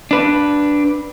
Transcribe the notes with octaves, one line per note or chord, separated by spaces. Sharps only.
D4 B4